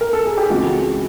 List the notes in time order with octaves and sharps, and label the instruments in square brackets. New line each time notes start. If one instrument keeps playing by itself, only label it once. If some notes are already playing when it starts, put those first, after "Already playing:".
[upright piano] A#4
A4
G#4
G4
C#2 C#3 E3 G#3 C4 F#4